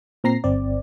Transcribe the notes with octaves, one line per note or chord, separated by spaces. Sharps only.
A#2 C4 A#5 A#6 C7
G1 C4 D5